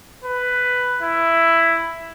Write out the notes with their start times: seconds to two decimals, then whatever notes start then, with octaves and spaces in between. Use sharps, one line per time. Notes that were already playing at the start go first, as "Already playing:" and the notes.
0.25 B4
1.02 E4